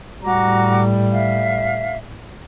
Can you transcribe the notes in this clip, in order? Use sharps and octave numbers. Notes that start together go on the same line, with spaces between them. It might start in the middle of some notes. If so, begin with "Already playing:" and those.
A2 G3 F#4 A#5 D6
E5 F5